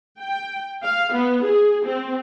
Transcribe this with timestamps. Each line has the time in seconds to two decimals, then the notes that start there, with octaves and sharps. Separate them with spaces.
0.20 G5
0.84 F5
1.13 B3
1.44 G#4
1.85 C4